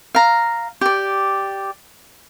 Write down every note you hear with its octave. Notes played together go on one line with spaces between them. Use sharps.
F5 A#5
G4 D5